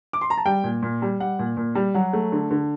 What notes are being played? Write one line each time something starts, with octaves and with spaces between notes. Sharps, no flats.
D6
C6
A#5
A5
G3 G5
A#2
A#2
G3
G3 F#5
A#2
A#2
G3
F#3 F#5
A3
D3
D3